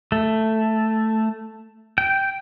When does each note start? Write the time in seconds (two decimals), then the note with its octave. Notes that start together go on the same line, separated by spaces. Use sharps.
0.12 A3
1.98 G5